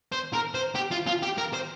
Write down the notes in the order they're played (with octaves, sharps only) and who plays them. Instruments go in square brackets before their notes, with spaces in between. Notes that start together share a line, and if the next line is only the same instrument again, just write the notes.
[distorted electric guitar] C5
A#4
C5
G4
F4
F4
G4
A#4
C5